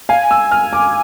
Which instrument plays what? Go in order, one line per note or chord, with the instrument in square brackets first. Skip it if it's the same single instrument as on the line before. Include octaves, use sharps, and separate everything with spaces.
[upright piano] F5 [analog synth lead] G#5
[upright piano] E6
F6
D6